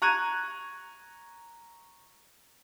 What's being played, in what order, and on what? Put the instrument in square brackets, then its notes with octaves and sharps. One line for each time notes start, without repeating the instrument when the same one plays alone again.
[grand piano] A#5 C#6 F#6 G#6 D#7